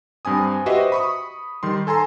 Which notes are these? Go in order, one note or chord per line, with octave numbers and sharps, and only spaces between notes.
G2 C4 G#5 D#6
F#4 G4 B4 C5 D#5 E5
B5 C#6 D#6
D#3 G3 C6
A4 G#5 A#5 C6